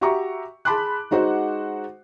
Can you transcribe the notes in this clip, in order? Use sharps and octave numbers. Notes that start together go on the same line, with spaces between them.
F#4 G4 E5 A#5 C#6
G#4 A5 B5 C6 D6 F#6
G#3 D#4 F#4 C5 F#5